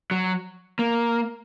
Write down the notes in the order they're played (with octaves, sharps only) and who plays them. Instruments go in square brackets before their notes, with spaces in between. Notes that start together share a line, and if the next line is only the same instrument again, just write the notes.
[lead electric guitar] F#3
A#3